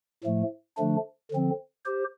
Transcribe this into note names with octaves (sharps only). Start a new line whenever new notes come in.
A2 F3 A3
D3 F3 A3 D4
D3 F3 C4
G4 C5